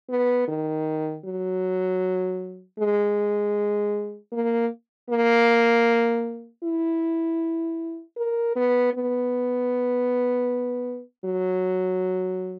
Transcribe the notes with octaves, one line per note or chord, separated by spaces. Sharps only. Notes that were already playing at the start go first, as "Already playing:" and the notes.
B3
D#3
F#3
G#3
A#3
A#3
E4
A#4
B3
B3
F#3